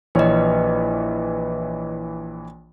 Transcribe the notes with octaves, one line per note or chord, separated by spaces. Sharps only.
A#1 E3 B4 C#5 D#5